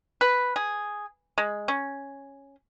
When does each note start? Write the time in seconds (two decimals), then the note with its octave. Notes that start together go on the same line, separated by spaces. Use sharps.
0.21 B4
0.56 G#4
1.38 G#3
1.68 C#4